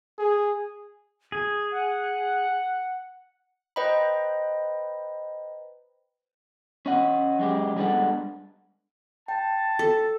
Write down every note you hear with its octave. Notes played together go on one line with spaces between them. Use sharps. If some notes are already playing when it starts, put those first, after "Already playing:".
G#4
G#4 G#6
F#5
B4 C5 D#5 G5 A#5 B5
C#4 D#5 F#5
F#2 G#3 G4
G3 G#3 B3 D4 A4 F#5
G5 A5
A4